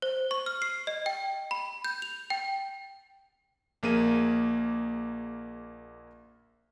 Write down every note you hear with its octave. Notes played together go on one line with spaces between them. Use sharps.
C5
C#6
F6
C7
D#5
G5
B5
G6
F7
G5
A#1 A#3 G#4 D#7